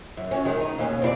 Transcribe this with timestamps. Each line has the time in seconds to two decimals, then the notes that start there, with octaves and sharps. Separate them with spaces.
0.17 F#2
0.31 C#4 F#4
0.45 D#3 G#3 D#4
0.61 D#4
0.78 D#2 B2 C#4
1.02 C4 E4 D5